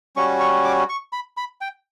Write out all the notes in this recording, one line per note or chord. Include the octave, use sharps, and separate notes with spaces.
G3 C#4 F#4 C#6
C#6
D6
C#6
B5
B5
G5